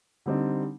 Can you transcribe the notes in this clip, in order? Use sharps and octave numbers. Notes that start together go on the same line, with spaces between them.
D3 G3 C4 D#4